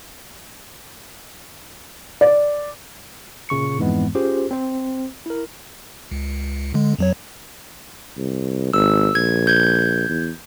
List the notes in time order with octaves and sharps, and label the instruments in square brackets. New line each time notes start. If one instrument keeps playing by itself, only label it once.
[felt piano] D5
[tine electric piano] A#2 C#3 C#6 C#7
F2 G#2 E3 G#3 B3
C#4 F4 G4 G#4 C5
C4 C5
E4 A#4
[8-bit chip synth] C#2
D3 G#3
F2 F#3 C#5
[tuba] C2
[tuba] G#1 [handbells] E6
[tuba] A#1 [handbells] G#6
[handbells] G6 G#6
[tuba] E2